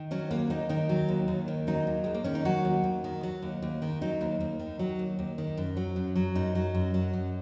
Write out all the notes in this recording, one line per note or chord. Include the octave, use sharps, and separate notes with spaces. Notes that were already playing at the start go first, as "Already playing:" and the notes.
Already playing: D#3
F#3 C#4
D#2 A#3
D#2 D#4
D#3 D#4
F#3
D#2
D#2
D#3
F#3 D#4
D#2
D#2 G#3
A#3
D#3 C#4
D#4
F#3 F#4
D#2
D#2
D#3
F#3
D#2
D#2
D#3
F#3 D#4
D#2
D#2
D#3
F#3
D#2
D#2
D#3
F#2
F#3
F#2
F#3
F#2 D#4
F#3
F#2
F#3
F#2